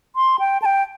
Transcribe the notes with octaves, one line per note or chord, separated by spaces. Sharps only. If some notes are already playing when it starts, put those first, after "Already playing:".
C6
G5
A5
G5